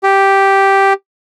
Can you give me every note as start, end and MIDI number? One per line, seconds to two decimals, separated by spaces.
0.03 0.93 67